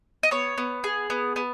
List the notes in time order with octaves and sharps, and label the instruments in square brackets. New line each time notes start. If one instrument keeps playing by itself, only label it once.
[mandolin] D#5
B3 C#5
B3
G#4
B3
B3